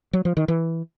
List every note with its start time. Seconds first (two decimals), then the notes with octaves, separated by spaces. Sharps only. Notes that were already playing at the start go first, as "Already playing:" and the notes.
0.13 F#3
0.25 F3
0.37 D#3
0.48 E3